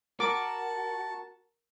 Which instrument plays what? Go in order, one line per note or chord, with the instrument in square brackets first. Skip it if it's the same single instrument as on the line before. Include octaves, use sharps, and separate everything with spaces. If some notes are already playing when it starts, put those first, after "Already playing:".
[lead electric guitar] F#4 [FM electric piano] A#4 [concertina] A5 [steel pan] D6